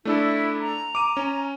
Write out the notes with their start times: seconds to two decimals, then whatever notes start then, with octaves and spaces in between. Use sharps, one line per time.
0.05 A3 D4 E4 A4
0.61 A#5
0.95 D6 D#7
1.17 C#4